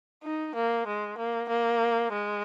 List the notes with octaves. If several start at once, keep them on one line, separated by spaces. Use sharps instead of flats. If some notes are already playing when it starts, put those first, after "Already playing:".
D#4
A#3
G#3
A#3
A#3
G#3